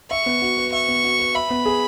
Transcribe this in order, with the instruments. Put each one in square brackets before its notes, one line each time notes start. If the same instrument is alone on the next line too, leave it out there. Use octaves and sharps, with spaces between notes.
[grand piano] E5 [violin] C#6
[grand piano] B3
F#4
B4
[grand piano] E5 [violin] C#6
[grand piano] B3
F#4
B4
[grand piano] E5 [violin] B5
[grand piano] B3
G#4